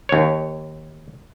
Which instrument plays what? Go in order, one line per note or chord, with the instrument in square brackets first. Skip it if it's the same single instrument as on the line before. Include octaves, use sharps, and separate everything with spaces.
[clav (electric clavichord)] D#2 C#5